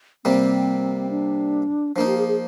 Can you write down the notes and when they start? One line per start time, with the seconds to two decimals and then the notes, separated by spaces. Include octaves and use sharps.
0.25 C3 G3 A#3 C4
1.10 D4
1.96 F3 A#3 D4 D#4
2.06 G4
2.18 G#4
2.28 G#4